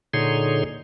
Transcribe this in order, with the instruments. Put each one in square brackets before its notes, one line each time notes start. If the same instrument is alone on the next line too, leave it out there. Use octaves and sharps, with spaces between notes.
[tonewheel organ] A#2 D3 D#4 G#4 C#5 C6